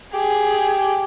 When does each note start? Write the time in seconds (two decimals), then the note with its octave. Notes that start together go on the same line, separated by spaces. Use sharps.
0.14 G4 G#4